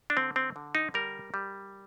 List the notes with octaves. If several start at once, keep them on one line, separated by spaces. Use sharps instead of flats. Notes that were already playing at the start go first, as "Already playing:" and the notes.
D4
D3 C4
C4
D3
D#4
G3 A#4
G3